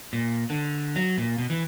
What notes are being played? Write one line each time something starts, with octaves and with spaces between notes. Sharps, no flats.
A#2
D3
F#3
A#2
B2
E3